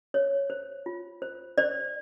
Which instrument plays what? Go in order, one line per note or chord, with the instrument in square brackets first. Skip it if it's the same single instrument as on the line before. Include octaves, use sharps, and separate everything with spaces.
[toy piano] C5 C#5
C5
F4
C5
C5 D5